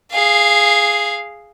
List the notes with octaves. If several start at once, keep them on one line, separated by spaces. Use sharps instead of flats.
G#4 F5